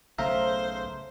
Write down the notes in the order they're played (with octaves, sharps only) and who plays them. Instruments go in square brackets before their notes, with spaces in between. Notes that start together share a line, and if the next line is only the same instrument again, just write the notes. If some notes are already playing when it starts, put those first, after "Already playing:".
[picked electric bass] B1 C#3 A3 [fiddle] C5 [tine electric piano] E5 F5 A#5